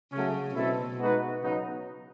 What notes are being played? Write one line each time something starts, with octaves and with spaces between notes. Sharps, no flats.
C#3 F#3 A3 C#4
B2 F#3 A3 C4 E4 A4
G#3 B3 D#4 F#4 B4
C#3 F#3 B3 D#4